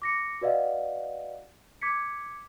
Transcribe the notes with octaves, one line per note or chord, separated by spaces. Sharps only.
D6 A#6 C#7
F#4 B4 D5 D#5 F5 F#5
D6 G#6 B6 C#7